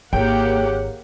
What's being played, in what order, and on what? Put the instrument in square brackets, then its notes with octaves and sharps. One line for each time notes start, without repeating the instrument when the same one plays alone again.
[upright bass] G#1 [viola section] A#3 G4 F#5 [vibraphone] G#4 C#5 [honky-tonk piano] G5